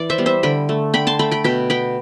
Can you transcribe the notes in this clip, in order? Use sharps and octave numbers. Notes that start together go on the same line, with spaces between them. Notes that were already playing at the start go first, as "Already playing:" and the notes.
Already playing: E3 D5
C5 E5
G3 B3
C5 E5
D3 G5 B5
A3
D3 G5 B5
A5 C6
A3 G5 B5
G5 B5
B2 G5 B5
B3 G5 B5